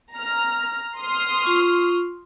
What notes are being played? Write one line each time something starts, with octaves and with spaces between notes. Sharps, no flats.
A#5 F6
C6 D#6 F6
F4 C#6